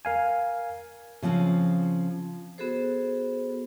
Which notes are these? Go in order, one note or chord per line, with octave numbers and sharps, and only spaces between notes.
A#4 F5 G#5
C#3 F3 C4 C#4
B3 F#4 G#4 A4 C5